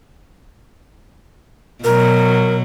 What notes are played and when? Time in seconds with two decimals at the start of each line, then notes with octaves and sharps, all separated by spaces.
1.84 B2 F#3 A#4